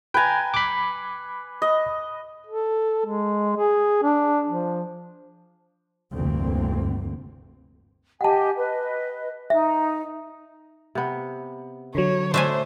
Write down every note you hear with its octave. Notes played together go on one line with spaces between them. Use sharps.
B4 G5 G#5 A#5
B5 D6
D#5
A4
G#3
G#4
D4
F3
F1 D2 G2 E3 A#3 C4
G4 D#5 F#5 G#5 A5
B4 D#5
D#4 E5
C3 B3
D3 F#3 C#5
A3 D4 C5 E5 G#5